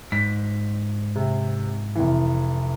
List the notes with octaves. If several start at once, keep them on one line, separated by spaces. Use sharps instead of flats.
G#2 B6
C3
F1 E3